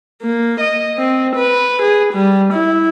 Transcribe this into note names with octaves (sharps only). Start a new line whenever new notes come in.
A#3
D#5
C4
B4
G#4
G3
E4